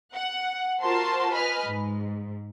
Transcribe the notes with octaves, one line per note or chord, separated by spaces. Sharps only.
F#5
F4 F#4 A#4 C5 A5 C6
B4 D#5 G#5 B5 F6
G#2